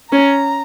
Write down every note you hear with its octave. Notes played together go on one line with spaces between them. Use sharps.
C#4 A#5